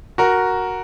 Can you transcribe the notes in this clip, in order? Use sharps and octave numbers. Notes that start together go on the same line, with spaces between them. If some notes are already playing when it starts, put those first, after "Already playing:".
F#4 A#4